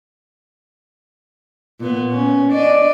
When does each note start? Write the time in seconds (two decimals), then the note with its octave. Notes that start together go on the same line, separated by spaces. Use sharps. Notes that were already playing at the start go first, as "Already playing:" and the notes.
1.80 A#2 B3
2.10 C#4
2.52 D4 D5 D#5